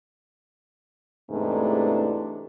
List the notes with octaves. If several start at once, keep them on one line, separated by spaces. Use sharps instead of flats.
E2 G#2 C3 E3 A3 D4